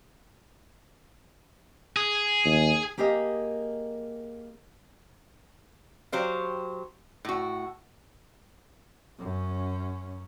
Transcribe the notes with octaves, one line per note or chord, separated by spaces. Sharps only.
G#4
D#2
A#3 G4 G#4 A#4 D#5
F#3 G4 C5 F5
A2 F#4
F#2 C#4